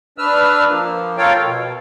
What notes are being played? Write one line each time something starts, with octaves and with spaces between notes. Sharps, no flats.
D4 B4 E6 F6
F3 A#3
F4 A4 A#4 C#5 F5 G5
B2